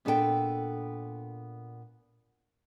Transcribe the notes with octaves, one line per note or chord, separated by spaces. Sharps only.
A#2 B3 D4 A4 C5 G5